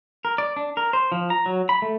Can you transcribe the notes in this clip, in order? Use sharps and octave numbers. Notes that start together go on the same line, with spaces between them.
A#4
D5
D4
A#4
C5
F3
A#5
F#3
B5
A3